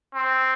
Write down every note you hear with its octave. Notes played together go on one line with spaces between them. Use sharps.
C4